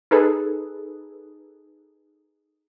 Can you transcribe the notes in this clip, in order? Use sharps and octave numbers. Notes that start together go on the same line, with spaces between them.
D#4 G#4 A4 B4